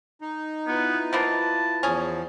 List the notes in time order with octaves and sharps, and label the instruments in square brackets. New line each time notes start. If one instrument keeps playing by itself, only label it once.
[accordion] D#4
[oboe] B3 [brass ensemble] E4 F4 B4
[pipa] F3 A#3 B3 [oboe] A5
[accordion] E2 F3 [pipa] C#4 G#4